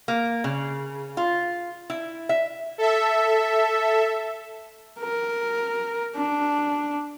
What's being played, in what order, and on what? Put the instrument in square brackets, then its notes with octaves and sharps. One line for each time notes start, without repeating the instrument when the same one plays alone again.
[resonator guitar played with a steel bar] A#3
C#3
F4
E4
E5
[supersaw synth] A4 E5
[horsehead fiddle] A#4
D4